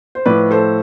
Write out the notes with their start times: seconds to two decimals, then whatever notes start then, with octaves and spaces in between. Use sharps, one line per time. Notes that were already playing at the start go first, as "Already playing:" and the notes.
0.15 C5
0.26 A2 F3 B4 D5
0.51 A4 C5